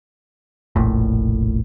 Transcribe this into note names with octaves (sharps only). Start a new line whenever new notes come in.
F1 A#1 A2